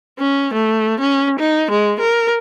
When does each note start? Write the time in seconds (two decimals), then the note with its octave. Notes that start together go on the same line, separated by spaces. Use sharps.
0.19 C#4
0.54 A3
1.00 C#4
1.39 D#4
1.71 G#3
2.00 A#4